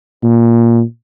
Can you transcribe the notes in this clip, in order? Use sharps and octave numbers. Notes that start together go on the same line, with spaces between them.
A#2